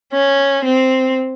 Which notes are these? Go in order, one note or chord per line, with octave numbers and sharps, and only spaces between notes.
C#4
C4